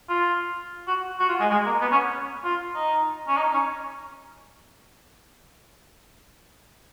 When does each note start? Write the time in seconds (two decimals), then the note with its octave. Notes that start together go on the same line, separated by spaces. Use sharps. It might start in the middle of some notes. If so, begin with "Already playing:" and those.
0.09 F4
0.87 F#4
1.19 F#4
1.29 F4
1.40 G#3
1.50 G#3
1.65 A#3
1.81 B3
1.91 C#4
2.44 F4
2.75 D#4
3.28 C#4
3.37 D#4
3.53 C#4